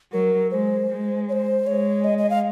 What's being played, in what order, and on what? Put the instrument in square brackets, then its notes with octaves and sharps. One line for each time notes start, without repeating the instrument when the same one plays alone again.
[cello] F#3 [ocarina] A#4
[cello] G#3 [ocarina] C5
[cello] G#3
[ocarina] C#5
C5
[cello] G#3 [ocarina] C#5
[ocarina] D#5
D#5
F5